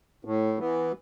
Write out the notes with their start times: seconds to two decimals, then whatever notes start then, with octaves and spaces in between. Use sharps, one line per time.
0.25 A2
0.58 E3 B3